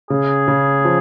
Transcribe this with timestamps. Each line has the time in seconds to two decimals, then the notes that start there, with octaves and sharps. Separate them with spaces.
0.10 C#3 G#4
0.48 C#3
0.85 F3